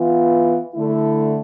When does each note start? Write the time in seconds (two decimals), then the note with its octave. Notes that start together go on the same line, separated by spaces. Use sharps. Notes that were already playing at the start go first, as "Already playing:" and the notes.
Already playing: E3 B3 F4
0.75 D3 A3 E4